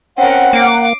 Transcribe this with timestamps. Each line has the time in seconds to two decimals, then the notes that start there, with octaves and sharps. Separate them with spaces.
0.18 C4 C#4 A#4 F#5
0.53 A#3 D6 C7